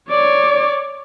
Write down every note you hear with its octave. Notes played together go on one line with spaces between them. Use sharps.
C#5 D5